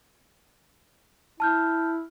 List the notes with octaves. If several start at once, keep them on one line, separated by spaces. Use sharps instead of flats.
E4 A5 F6 G6